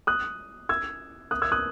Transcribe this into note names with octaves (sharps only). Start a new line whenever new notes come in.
D#6 F#6
E6 G#6
D#6 F#6
E6 G#6
D#6 F#6